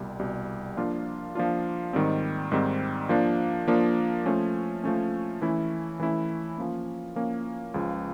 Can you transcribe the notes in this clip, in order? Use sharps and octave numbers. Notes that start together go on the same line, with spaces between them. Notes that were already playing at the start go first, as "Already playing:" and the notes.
Already playing: C2 B2 G3
C2 B2 G3
F3 A#3 D4 F4
F3 A#3 D4 F4
G#2 D#3 G3 C4
G#2 D#3 G3 C4
F3 A#3 D4
F3 A#3 D4
F3 A3 C#4
F3 A3 C#4
E3 A3 C#4 E4
E3 A3 C#4 E4
F3 A#3 C#4
F3 A#3 C#4
C#2 C#3 F3